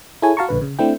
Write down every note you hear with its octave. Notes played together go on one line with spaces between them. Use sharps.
E4 G#4 A4 C#5 G#5
F#4 F5 A5 A#5 C#6
A#1 D3 B4
C#3
A3 C4 D4 E4 G5